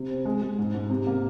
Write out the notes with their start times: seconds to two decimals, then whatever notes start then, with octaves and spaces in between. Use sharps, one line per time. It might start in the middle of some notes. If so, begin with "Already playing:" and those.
Already playing: C3
0.09 C4
0.25 G#3
0.42 G#3
0.58 G#2
0.74 G#2
0.90 C3
1.07 A#3